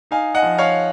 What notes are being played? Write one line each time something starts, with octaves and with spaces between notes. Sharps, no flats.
D#4 F5 G#5
D#5 F#5
F3
C#5 F5